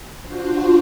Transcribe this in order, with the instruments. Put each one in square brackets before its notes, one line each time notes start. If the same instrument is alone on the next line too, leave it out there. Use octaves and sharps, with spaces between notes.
[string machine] D4 F4 F#4 C5